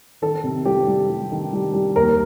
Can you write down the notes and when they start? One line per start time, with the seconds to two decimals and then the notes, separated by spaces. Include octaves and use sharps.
0.22 D#3 A4
0.44 C3
0.65 G3 G4
0.87 G3
1.10 G3
1.32 D#3
1.53 G3
1.74 G3
1.96 D#2 A#4